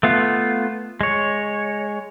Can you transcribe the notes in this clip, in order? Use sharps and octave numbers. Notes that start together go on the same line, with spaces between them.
A3 B3 F4
G#3 C#5